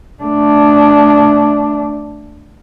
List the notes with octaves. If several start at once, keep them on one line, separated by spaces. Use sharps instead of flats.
A3 D4